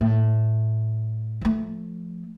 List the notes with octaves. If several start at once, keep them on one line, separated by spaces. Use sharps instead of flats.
A2
F3 A3